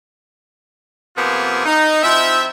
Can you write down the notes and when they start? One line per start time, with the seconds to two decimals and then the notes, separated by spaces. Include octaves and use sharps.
1.16 C3 F3 A#3 B3 F4 G#4
1.65 D#4
2.02 F3 C4 E4 E5